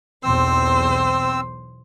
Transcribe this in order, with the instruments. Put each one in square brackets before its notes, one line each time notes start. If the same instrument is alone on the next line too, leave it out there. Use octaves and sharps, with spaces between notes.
[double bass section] B1 E2 B2 [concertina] C4 E6 [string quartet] C5